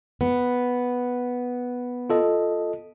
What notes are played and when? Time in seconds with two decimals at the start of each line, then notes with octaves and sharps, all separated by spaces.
0.21 B3
2.10 F4 A4 D#5